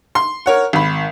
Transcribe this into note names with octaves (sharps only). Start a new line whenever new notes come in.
C6
A#4 C#5 F#5
G#1 B5